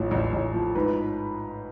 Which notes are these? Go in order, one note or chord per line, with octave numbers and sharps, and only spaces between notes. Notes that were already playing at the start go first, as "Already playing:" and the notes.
Already playing: A1 A2 F3
A1
A1
F3
G#2 B4